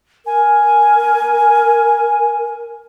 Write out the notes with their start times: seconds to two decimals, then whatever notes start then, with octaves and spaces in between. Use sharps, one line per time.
0.26 A#4 G#5